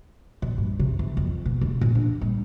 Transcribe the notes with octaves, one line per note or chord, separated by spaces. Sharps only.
A#2
G2
C3
E3
F2
B2
E1
A#2
D4
G3